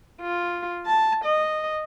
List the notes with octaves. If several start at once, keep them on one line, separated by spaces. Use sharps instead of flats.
F4
A5
D#5